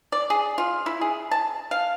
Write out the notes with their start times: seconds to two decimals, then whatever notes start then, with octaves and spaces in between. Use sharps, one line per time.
0.12 D5
0.30 G#4
0.58 F4
0.86 E4
1.01 G#4
1.31 A5
1.71 F5